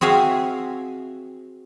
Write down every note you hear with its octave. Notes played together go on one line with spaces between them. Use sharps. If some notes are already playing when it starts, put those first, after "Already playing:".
C4 F#4 G#4 E5 F5